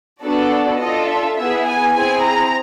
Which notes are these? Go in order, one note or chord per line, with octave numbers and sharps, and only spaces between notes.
B3 D4 F#4 A4 D5
D4 F4 A4 D#5
E5
B3 E4 G#4 E5
G#5
C4 E4 G#4 G#5
A#5